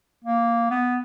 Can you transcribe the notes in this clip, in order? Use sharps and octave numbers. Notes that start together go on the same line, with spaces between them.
A#3
B3